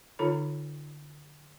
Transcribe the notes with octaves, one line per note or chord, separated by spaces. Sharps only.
D3 D#4 F4 A4 C#5 B5